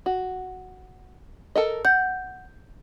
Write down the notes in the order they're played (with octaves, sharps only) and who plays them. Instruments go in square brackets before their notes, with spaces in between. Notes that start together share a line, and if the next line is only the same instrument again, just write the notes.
[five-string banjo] F#4
A4 A#4 D#5
[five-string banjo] F#5 [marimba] G6